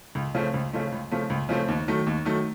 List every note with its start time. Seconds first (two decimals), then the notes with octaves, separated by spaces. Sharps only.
0.15 C#2
0.35 C#3 F3 A3 C4
0.54 C#2
0.73 C#3 F3 A3 C4
0.92 C#2
1.11 C#3 F3 A3 C4
1.30 C#2
1.49 C#3 F3 A3 C4
1.68 D#2
1.88 D#3 F#3 A3
2.07 D#2
2.25 D#3 F#3 A3